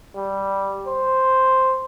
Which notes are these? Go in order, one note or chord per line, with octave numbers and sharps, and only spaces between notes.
G3
C5